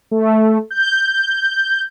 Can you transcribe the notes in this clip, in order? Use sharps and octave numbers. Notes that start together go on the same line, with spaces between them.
A3
G6